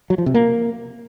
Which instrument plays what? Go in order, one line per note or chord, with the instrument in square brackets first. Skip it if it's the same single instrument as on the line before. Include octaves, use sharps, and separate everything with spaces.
[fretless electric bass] F#3
F3
C3
A#3